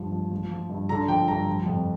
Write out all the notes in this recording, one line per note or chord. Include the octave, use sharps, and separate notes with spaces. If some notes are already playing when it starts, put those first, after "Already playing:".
Already playing: G2 F3
F3
F3
F3
G2
D3 A#5
F3 G5
G2 A#5
F3
F2